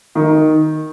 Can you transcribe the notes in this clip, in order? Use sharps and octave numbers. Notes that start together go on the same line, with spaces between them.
D#3